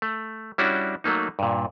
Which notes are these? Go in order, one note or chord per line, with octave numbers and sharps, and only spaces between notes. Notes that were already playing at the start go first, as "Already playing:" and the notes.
A3
G3 C#4 D4 E4 F#4
F#3 A3 A#3 D#4
G2 A#2